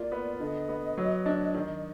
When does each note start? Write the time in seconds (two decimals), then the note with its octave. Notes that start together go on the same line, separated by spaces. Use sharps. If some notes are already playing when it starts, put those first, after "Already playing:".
Already playing: A#3 F4 D5
0.12 B3
0.40 D3 D#5
0.69 B3
0.97 F#3
1.26 D4
1.54 D#3